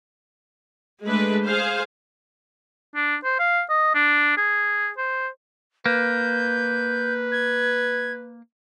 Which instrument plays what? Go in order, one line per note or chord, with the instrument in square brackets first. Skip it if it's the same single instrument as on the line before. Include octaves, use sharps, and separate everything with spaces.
[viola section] G#3 A3 D4 B4
G#4 C5 F5
[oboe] D4
C5
F5
D#5
D4
G#4
C5
[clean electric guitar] A#3 [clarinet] B4 [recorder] G6
[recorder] G#6